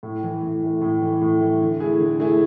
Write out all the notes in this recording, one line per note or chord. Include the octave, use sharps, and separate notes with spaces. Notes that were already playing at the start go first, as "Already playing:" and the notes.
A2
E3 A3
A2
E3 A3
A2
E3 A3
A2
E3 A3
D3
A3 E4 G#4
D3
A3 E4 G#4